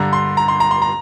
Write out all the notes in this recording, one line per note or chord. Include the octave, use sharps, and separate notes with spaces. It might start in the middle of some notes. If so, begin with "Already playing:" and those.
Already playing: G2 D3 A#5
C6
A#5
C6
A#5
C6
A#5